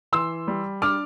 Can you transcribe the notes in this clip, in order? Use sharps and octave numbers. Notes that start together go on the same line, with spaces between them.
E3 C6 E6
G3
D4 D6 F6